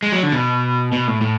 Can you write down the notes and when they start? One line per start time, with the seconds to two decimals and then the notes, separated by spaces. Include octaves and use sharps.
0.03 G#3
0.12 F#3
0.23 D3
0.32 B2
0.92 B2
1.07 A2
1.21 A2